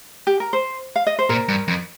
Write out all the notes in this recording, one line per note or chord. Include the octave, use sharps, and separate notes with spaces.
G4
A#4
C5
F5
D#5
C5
A#2 A#4
G2
F2